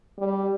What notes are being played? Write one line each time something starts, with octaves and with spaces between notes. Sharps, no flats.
G3